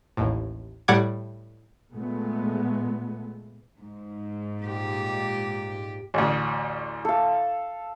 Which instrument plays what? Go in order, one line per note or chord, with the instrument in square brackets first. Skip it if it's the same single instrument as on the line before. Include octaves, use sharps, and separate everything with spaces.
[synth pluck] A1 D#2 A2
A2 G3 F#5 D6 G#6
[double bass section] A#2 G#3 A3 B3
[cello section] G#2
[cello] A#2 G4
[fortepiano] A1 D2
[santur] A4 F5